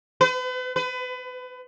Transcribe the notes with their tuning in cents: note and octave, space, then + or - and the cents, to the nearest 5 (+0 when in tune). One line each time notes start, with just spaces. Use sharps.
B4 +40
B4 +30